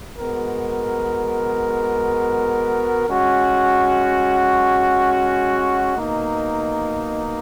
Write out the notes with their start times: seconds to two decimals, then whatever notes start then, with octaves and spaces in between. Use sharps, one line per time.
0.18 G#3 B3 F#4 A#4
3.07 G#3 C#4 F#4
5.97 B2 A#3 D#4